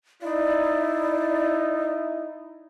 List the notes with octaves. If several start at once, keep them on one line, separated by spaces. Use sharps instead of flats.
D#4 E4 D5